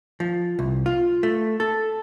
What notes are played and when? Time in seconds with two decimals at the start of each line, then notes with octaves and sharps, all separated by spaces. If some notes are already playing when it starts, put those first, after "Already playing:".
0.20 F3
0.59 C2
0.86 F4
1.23 A3
1.60 A4